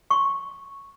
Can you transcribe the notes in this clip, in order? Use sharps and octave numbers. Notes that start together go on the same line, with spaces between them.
C6 C#6